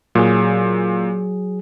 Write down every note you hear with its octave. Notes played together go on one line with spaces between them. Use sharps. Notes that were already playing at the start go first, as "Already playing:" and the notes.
A#2 F#3 G#4